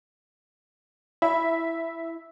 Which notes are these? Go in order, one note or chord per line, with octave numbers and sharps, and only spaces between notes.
E4 E5